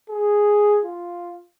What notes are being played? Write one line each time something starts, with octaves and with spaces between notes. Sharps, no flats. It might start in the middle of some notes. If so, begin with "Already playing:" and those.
G#4
F4